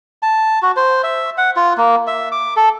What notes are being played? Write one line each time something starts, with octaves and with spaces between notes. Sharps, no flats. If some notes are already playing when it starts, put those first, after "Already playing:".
A5
F#4
C5
E5
F#5
F4
A#3
E5
D6
A4